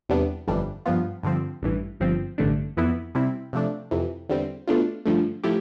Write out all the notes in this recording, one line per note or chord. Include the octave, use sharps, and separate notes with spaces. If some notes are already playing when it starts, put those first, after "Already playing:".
E2 C3 G3 B3 D4
G1 F2 E3 G3 D4
G2 F3 B3 F4
G2 D3 F3 C4
A1 G2 E3
G1 G2 F3 C4
A1 G2 D3 A3 D4
F2 E3 B3 E4
C3 G3 C4 E4
C3 F3 A3 D4
F2 C3 E3
E2 D3 G3 C4
B2 A3 D4 F4
G2 D3 F3 A3
A2 F3 A3 E4 G4